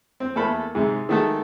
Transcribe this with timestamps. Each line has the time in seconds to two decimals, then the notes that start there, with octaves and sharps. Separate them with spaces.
0.20 C4
0.36 E2 A3 A#3 A4 B5
0.75 G#2 C3 G#3
1.09 D#3 G#3 A3 F#4 A4